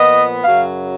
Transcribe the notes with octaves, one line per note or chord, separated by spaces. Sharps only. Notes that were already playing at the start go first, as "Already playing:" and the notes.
Already playing: A#2 F3 B3 D#5
F#2 C#3 F#3 F5